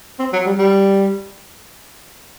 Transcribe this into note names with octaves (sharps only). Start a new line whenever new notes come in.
C4
F#3
G3
G3